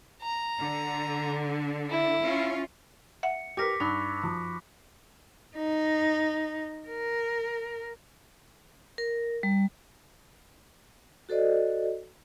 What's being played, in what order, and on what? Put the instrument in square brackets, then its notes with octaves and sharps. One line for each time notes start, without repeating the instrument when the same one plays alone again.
[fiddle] A#5
[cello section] D3
[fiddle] E4
[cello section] C#4 F4
[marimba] E5 F#5 [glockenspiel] C#7
[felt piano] G4 A#4 B4 [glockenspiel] D6 A#6 B6
[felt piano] G2 [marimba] D#4 [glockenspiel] B5 C#6 F#6
[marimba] F#2 [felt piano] F3
[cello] D#4
A#4
[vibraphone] A#4
G3
F#4 A4 C5 D5 D#5